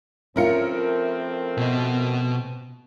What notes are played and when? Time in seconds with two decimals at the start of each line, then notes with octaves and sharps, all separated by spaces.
0.36 F3 A3 C4 C#4 E4 F4 A#4 C#7
1.57 B2 D#5